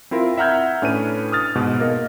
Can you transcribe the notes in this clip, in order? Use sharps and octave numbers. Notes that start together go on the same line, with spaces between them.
C4 E4 F4 A#4
E5 F#5 A#5 F6 G6 G#6
A2 C#4 D4 B4 D#7
D#6 F6 A6
G#2 B2
A#3 A#4 D#5